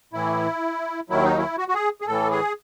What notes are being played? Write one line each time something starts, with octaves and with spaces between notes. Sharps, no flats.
A2 E3 E4
D#2 D#3 F#3 E4
D#4
E4
F#4
F#4
G#4
G#4
A2 E3 A4
G#4